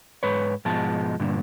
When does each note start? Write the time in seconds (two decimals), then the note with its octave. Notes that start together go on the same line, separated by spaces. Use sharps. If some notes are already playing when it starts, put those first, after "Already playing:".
0.23 G#2 B4 C#5
0.65 G#2 B2 F3 G#3 A5
1.19 G2 A#2 D3